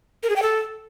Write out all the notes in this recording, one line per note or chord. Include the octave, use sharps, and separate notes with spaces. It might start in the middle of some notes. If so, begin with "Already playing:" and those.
A#4
G#4
G5
A4